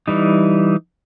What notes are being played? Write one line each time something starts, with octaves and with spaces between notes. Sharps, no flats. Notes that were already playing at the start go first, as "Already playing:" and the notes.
E3 G3 D#4